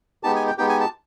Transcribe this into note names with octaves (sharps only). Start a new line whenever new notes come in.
G#3 B3 D#4 G4 A5
G#5
G5
G#3 B3 D#4 G4 G5
G#5
A5